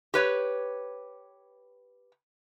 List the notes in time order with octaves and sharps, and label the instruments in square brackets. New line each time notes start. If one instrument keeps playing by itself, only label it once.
[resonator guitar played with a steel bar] G4 B4 C#5